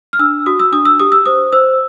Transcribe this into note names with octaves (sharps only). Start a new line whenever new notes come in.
F6
D4 E6
F#4 D#6
E6
D4 D#6
E6
G4 D#6
E6
C5 D#6
C5 E6